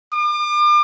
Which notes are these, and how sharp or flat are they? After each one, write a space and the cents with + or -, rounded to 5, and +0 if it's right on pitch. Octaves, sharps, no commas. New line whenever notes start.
D6 +40